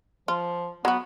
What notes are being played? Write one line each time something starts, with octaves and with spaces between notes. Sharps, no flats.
F3 F4
F#3 B3 F#4